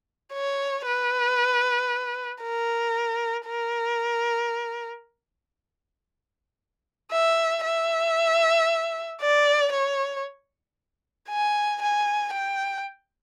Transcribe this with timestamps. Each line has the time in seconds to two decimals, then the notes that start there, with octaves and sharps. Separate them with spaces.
0.33 C#5
0.86 B4
2.43 A#4
3.46 A#4
7.11 E5
7.64 E5
9.21 D5
9.73 C#5
11.29 G#5
11.82 G#5
12.33 G5